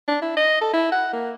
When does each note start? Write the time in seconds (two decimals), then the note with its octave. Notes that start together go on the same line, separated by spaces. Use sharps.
0.08 D4
0.22 E4
0.37 D#5
0.61 A4
0.73 E4
0.92 F#5
1.13 A#3